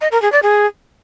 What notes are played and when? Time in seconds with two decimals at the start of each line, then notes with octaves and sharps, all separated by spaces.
0.01 D#5
0.12 A#4
0.22 G#4
0.32 D5
0.43 G#4